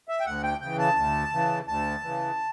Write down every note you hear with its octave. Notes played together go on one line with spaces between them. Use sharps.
E5
G5
D2 F#5
G5
C#3 E3 G5
A5
D2
C#3 E3
D2 A5
C#3 E3